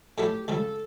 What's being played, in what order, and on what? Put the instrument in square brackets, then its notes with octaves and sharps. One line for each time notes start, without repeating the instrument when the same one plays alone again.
[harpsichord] A2 F#3 A3 E4 [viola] G4
[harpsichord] C#2 C#3 G3 [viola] A4